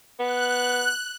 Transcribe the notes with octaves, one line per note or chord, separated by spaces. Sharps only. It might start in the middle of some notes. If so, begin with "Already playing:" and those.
B3 F#6